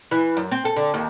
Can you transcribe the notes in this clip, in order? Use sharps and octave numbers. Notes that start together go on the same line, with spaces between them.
E3
F#2
C4
A4
D3
D#2